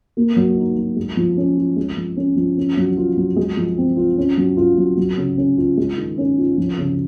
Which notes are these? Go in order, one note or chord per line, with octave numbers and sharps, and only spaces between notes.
A#3
F#3
D#4
F#3
G#3
F3
C#4
F4
G#3
F3
C#4
F3
C#4
F#3
F4
F#3
G#3
F3
C4
F4
C#4
F#3
F4
F#3
F#3
C#3
C#4
F4
G#3
D#3
C#4
F4
F3
C#3